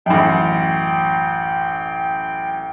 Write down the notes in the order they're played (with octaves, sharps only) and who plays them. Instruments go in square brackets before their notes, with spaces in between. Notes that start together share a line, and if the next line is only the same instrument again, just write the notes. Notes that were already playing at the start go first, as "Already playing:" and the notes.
[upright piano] A1 F#2 [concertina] G5